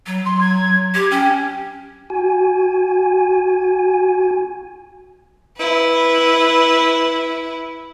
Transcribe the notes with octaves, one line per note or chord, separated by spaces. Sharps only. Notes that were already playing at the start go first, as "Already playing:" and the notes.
F#3
C6
G#6
G4 G#6
C#4 G5
F#4 G#5
E4 B4